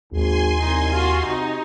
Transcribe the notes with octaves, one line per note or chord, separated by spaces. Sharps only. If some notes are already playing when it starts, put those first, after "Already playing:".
G#1 D#2 G#5 C6
C2 D#4
F4 F#4
C3 D#4